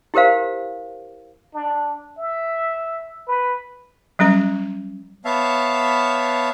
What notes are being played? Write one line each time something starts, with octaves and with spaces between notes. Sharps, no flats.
E4 G4 A#4 C5 F5
D4
E5
B4
F#3 G3 C#4 A#5
B3 C#5 E5 F5 A5